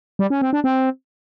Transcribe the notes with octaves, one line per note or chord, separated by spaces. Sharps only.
G3
C#4
C4
D4
C4